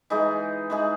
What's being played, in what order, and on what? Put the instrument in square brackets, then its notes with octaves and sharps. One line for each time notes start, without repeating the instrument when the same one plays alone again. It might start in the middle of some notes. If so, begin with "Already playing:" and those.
[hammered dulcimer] E3 G#3 D#4 G#4
E3 G#3 D#4 G#4